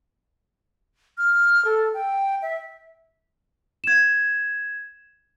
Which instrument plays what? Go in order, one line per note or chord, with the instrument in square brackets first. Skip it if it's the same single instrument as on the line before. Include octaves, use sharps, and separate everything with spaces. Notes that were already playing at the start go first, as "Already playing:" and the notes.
[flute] F6
A4
G5
E5
[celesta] G#6 E7